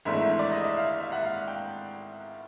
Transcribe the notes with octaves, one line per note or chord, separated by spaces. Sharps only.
G#1 G#2 E3 A3 D4 E5
D5
D#5
E5
F5
E5
F#5
F5
G5